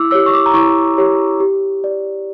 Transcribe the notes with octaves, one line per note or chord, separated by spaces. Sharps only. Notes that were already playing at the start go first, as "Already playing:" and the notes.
Already playing: E4 D6 E6
G4 C#5 E6
C#6
D6
A#5
E4 C#6
G4 C#5
G4
D5